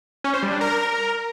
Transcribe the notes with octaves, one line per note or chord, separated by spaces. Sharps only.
C#4
C5
G3
D4
A#4